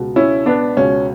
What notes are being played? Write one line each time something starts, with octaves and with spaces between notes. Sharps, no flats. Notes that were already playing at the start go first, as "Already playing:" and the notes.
Already playing: C#2 B2
C#4 E4
B3 D4
C#2 B2 C#4